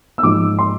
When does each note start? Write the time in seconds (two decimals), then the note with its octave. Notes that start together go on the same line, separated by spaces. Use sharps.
0.18 E6
0.23 G#2 F3 G#3 D6
0.59 C6